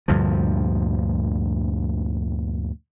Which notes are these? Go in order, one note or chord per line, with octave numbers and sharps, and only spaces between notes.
D2 G2 A#2 F3